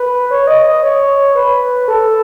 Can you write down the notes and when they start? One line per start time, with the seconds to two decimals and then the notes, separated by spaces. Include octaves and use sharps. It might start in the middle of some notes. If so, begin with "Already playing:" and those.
Already playing: B4
0.31 C#5
0.47 D#5
0.65 D#5
0.83 C#5
1.35 B4
1.88 A4